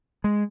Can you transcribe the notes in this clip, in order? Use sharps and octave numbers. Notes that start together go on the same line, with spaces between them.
G#3